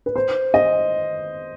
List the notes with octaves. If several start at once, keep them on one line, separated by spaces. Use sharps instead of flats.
B4
C5
D#5